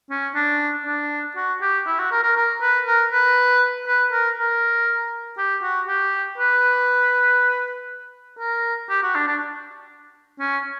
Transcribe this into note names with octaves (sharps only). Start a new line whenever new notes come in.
C#4
D4
D4
F#4
G4
E4
F#4
A#4
A#4
A#4
B4
A#4
B4
B4
A#4
A#4
G4
F#4
G4
B4
A#4
G4
F#4
D4
D4
C#4